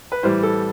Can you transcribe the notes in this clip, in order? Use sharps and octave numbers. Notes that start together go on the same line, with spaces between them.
B4
A2 E3 G3 C5
A4